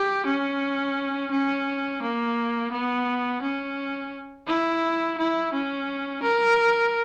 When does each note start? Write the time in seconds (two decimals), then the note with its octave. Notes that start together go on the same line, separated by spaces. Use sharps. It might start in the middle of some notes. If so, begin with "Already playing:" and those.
Already playing: G4
0.26 C#4
1.31 C#4
2.02 A#3
2.72 B3
3.42 C#4
4.47 E4
5.18 E4
5.53 C#4
6.22 A#4